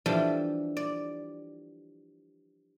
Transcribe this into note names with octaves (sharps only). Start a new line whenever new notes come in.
E3 F3 G3 D4 A4 B5
D5